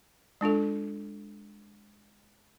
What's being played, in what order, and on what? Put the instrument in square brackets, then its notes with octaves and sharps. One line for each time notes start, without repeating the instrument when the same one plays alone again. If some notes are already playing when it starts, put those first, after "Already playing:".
[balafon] G#3 D4 F4 A4